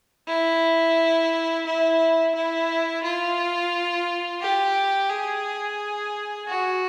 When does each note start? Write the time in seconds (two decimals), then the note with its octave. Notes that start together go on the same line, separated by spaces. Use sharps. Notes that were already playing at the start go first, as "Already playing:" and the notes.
0.28 E4
1.66 E4
2.35 E4
3.03 F4
4.41 G4
5.10 G#4
6.48 F#4